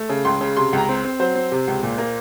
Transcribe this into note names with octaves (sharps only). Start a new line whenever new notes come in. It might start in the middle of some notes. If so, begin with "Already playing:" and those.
Already playing: A3
C#3
C#2 C6
C#3
C3 C6
C#2 A#5
C4
C4
F#3 C5
C4
C3
C#2
A#2
A#3